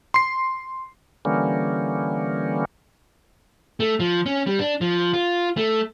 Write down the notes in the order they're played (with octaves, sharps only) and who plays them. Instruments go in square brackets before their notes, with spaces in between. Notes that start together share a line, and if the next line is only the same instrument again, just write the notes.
[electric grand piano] C6 C7
[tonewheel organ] D3 E3 G3 A#3 C#4
[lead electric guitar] A3
F3
C#4
G3
D4
F3
F4
A3